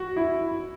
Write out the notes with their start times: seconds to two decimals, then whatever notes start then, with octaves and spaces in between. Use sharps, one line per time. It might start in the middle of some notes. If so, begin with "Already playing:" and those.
Already playing: F#4
0.16 E4